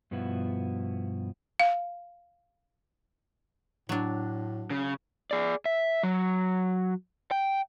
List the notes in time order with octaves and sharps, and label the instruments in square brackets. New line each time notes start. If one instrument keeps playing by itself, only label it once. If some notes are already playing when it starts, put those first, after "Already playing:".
[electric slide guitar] G2 B2 F3 B3 E4 F#4
[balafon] F5
[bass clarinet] A2 [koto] F#3 D4
[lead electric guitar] C#3
[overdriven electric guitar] G#4 D5
E5
F#3
G5